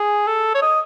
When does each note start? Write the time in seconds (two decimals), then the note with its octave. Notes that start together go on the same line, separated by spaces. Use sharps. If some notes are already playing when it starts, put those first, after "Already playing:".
Already playing: G#4
0.27 A4
0.55 C#5
0.62 D#5